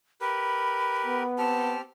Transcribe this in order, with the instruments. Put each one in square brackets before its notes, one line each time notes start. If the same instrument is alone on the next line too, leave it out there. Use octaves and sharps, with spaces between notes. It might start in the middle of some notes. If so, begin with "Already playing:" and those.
[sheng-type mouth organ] G4 A#4 B4 [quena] B5
[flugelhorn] B3
[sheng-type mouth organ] C4 G4 F6 [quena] A5